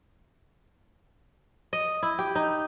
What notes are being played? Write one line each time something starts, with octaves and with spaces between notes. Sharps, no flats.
D#5
E4
G4
D#4